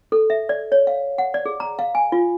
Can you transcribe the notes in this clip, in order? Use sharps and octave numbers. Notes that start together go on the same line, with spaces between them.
A4
E5
D5
C#5
F5
F#5
D5
G#4
A#5
F5
G#5
F4